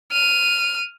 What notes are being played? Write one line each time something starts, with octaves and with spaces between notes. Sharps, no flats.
F6 D#7